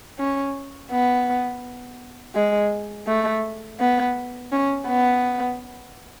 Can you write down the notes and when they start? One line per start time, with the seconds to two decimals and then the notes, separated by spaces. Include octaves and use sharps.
0.19 C#4
0.91 B3
2.35 G#3
3.07 A3
3.80 B3
4.52 C#4
4.87 B3